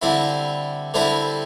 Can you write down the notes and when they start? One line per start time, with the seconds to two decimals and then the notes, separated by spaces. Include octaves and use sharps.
0.02 D3 G3 C4 E4
0.94 D3 G3 C4 E4